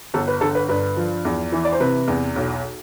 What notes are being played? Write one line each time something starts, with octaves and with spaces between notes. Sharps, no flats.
G1 A4
B4
D3 A4
B4
G2 B4
F3
E2
E3
D5
C5
C3 B4
E2
B1